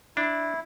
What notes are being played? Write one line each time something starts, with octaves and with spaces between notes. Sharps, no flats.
D4 E4